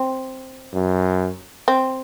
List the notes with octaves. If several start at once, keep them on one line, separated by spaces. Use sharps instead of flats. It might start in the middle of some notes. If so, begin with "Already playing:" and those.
Already playing: C4
F#2
C4